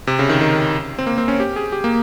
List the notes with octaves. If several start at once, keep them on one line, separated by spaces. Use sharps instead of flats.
C3
C#3
D#3
D#3
C4
A#3
C4
C#4
G4
G#4
G4
A#3